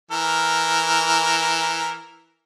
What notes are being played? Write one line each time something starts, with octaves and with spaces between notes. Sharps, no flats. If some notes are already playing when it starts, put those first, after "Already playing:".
E3 A#4